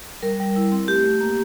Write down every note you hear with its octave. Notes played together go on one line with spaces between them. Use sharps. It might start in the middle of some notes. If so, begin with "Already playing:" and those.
G3 A#4
G3
E4
C4
A3 G4
A3
A#3